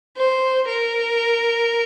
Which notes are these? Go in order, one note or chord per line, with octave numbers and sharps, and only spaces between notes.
C5
A#4